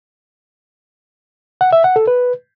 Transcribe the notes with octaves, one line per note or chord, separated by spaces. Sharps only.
F#5
E5
F#5
A4
B4